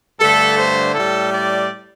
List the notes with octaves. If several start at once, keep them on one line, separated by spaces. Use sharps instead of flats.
G2 D3 A3 A4
C5
A2 G3 A4
D5